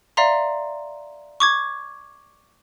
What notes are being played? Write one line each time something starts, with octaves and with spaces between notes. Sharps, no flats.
D5 E5 F5 A#5 C6
C#6 D6 G#6